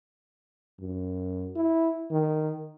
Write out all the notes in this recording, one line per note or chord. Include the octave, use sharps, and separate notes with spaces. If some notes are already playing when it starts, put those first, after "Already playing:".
F#2
E4
D#3